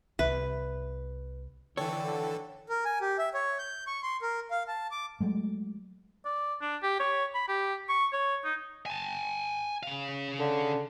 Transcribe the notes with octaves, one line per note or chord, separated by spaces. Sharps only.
C2 B4 E5
D3 E3 A4 C#5 G5
A#4
G#5
G4
E5
C#5
G6
C#6
C6
A#4
F5
A5
D6
F#3 G#3 A3
D5
D4
G4
C#5
B5
G4
C#6
C#5
D#4
G#5 A5
C#3 F5
D3